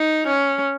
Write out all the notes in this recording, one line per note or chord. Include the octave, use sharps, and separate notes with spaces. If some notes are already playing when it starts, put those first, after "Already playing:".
Already playing: D#4
C#4